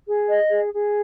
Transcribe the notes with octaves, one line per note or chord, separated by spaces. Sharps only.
G#4
D#5
G#4
G#4